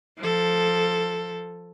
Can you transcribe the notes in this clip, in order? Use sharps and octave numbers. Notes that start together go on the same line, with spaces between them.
F3 A4